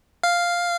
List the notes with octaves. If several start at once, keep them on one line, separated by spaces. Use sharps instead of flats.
F5